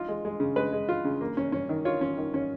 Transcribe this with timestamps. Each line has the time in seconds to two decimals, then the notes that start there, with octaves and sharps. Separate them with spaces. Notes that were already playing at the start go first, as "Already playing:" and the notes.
Already playing: D#4 F4
0.09 G#3
0.25 G#3
0.40 C#3
0.56 G#3 B4
0.73 G#3
0.89 F4
1.05 C#3
1.21 A#3
1.37 C#4
1.52 C#4
1.69 D#3
1.85 F4 C#5
2.01 C#4
2.17 D#3
2.34 C#4